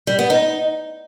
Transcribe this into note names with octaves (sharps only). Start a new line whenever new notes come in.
G3
B3
D#4